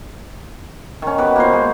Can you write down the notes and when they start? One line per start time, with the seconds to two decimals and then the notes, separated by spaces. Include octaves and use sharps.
1.02 D#3 C#4
1.18 B3 F#4 G4 B4
1.36 A#3 F#4 C5
1.53 G#3